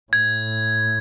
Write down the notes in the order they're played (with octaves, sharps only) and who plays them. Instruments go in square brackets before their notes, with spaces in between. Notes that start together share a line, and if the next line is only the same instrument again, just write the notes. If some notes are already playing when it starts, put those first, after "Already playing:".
[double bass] A2 [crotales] G#6